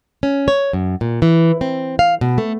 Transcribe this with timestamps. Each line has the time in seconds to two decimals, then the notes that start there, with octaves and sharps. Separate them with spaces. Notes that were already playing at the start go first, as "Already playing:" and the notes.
0.23 C#4
0.48 C#5
0.73 F#2
1.01 A#2
1.22 E3
1.61 C4
1.99 F5
2.21 B2
2.38 A3